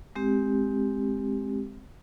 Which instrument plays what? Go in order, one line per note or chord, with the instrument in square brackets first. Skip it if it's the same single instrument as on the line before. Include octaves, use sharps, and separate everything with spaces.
[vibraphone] G#3 C4 G4